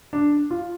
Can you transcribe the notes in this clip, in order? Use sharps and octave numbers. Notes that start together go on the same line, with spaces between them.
D4
F4